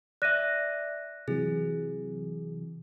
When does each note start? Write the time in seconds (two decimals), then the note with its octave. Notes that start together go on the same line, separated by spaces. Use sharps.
0.22 D5 E5 F#6 A#6 D#7
1.28 C3 E3 F#3 G#4